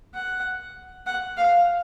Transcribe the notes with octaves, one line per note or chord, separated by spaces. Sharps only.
F#5
F#5
F5